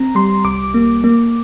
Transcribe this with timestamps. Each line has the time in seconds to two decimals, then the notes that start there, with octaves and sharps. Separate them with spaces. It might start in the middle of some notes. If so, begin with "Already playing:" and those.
Already playing: C4 A#5
0.15 G3 C6
0.45 C2 D6
0.74 A#3
1.04 A#3